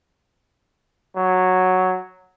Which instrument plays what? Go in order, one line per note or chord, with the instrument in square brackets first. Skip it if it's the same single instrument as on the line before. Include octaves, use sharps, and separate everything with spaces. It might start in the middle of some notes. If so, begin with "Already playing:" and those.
[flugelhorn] F#3